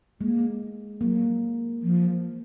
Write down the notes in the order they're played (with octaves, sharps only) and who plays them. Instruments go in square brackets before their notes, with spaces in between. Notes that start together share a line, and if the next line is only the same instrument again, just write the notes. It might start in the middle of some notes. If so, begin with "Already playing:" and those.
[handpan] G#3 [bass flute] A#3
[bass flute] F#3 [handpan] A#3
[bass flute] F3